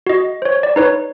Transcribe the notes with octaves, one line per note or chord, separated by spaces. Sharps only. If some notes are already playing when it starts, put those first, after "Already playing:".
F#4 D#5
C5 C#5
D5
D#4 B4 C#5